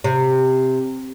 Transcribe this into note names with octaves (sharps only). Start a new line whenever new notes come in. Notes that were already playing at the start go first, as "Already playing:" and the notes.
C3